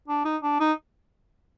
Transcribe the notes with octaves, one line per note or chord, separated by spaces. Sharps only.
D4
D#4
D4
D#4